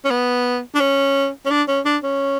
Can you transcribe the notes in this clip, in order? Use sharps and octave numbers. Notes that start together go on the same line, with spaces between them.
C#4
B3
D4
C#4
C#4
D4
C#4
D4
C#4